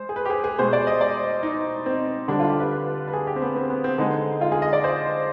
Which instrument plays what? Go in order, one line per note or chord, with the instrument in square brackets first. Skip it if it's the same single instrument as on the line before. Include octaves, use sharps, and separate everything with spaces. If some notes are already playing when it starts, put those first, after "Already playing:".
Already playing: [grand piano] G#3 C5
G#4
B4
G4
G#4
G#4
B2 G#3 C5
D5
D#5
D5
D#4
C4
D3 G3 D4
F4
G4
B4
B4
B4
G#4
G4
C4
B3
C4
B3
C4
D3 G#3 D#4
F4
G#4
D#5
D5
C5